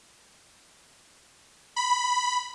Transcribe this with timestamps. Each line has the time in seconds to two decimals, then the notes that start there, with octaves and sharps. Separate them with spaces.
1.76 B5